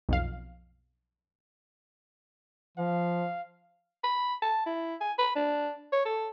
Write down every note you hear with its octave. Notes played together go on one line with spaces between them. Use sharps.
B1 F2 F5
F3 F5
B5
A5
E4
G#5
B5
D4
C#5
A4